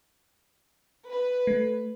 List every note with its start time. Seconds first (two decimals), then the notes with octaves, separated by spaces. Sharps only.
1.08 B4
1.47 A3